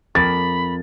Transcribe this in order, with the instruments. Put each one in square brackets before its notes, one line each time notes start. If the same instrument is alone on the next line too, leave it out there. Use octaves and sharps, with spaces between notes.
[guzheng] F2 A#3 [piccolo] B5 [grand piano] A6